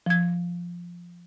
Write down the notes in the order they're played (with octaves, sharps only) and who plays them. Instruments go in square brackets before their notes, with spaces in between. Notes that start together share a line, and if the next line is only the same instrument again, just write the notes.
[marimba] F3 G#6